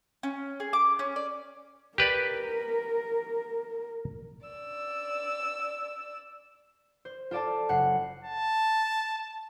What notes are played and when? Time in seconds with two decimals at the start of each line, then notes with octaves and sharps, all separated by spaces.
0.23 C#4
0.60 G#4
0.73 D6
0.99 C#4
1.16 D5
1.98 G4 A#4 B4 D5
4.46 D5 E6
7.05 C5
7.31 F4 A4 D5 F5 A5
7.69 F#1 C#4 F#5 C7
8.24 A5